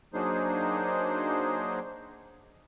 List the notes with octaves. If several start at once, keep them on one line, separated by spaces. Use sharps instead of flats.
F#3 A#3 D4 D#4 G#4 C5